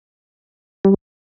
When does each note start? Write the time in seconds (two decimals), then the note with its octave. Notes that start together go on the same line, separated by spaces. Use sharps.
0.85 G3